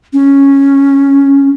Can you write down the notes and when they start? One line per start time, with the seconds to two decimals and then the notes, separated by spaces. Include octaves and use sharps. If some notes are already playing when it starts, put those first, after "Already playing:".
0.13 C#4